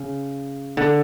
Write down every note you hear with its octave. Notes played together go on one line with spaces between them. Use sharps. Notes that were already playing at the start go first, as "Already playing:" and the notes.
Already playing: C#3
D3